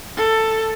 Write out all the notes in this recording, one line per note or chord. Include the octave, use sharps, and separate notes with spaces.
A4